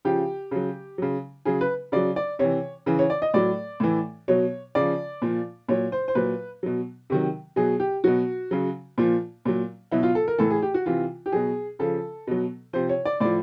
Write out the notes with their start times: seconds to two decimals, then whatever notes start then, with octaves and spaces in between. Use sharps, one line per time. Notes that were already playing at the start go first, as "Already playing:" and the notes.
0.05 C#3 F3 G4
0.51 C#3 F#3
0.98 C#3 F#3
1.45 C#3 F#3 G#4
1.61 B4
1.92 C#3 F#3 D5
2.16 D5
2.39 C3 E3 C#5
2.86 C#3 E3
2.99 C#5
3.10 D5
3.22 D#5
3.34 A2 F#3 D5
3.80 A2 E3
4.28 B2 F#3 C#5
4.75 C#3 F3 D5
5.22 A#2 F3
5.68 A#2 F#3 C#5
5.92 C5
6.08 C5
6.15 A#2 F#3 B4
6.63 B2 F#3
7.10 C3 D#3 F#3
7.56 B2 F#3 G#4
7.80 G4
8.04 B2 F#3 F#4
8.51 C#3 F#3
8.98 A#2 F3
9.45 A#2 F#3
9.92 B2 F#3 E4
10.03 F4
10.15 A4
10.28 A#4
10.38 A2 E3 A4
10.50 G#4
10.62 G4
10.74 F#4
10.86 C3 E3 F4
11.26 G4
11.32 B2 F#3 G#4
11.79 C#3 F3 A4
12.27 B2 F#3
12.73 C3 F3 C5
12.89 C#5
13.05 D5
13.20 A2 F3 D5